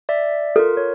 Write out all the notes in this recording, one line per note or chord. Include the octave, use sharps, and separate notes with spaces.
D5 E5
F4 A4 A#4
C#5